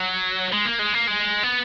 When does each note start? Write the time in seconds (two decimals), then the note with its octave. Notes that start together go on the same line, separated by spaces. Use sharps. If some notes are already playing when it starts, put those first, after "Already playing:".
Already playing: F#3
0.53 G#3
0.65 A#3
0.79 G#3
0.94 A#3
1.07 G#3
1.43 B3